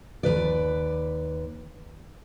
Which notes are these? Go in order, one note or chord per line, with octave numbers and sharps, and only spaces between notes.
D#2 D#3 B4 D5